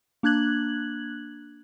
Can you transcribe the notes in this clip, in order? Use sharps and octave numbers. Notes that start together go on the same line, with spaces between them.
A#3 D4 F#6 G#6 F#7